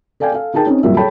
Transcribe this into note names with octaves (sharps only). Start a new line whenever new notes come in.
A4 D5 F5 G5 G#5
A4 F5
D#4 G#4 A#4 G5 A5
C4 C#4 D#4
F#2 A#2 G3 A#4 E5
G#4 A4 C#5 G5 A5 B5